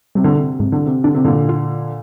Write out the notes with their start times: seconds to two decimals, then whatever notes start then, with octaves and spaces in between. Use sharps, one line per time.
0.15 C3 G3
0.24 D3
0.35 C3
0.59 G#2 C3
0.72 D3
0.85 C3
1.04 D3 D4
1.14 C3
1.24 A#2 D3
1.49 F4